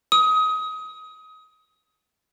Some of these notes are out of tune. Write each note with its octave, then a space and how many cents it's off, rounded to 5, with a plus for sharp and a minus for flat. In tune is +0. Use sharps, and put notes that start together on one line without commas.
D#6 +25